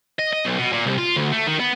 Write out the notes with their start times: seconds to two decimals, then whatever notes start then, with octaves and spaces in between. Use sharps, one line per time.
0.19 D#5
0.33 D#5
0.45 B1
0.58 B2
0.72 A#2
0.86 C2
0.98 F4
1.16 D2
1.32 A3
1.47 D#3
1.59 B3